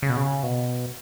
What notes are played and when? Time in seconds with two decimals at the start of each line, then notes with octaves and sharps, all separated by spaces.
0.02 C#3
0.10 B2
0.17 C#3
0.43 B2